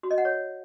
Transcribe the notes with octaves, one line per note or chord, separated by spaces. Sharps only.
F#4
D#5
F#5
C#5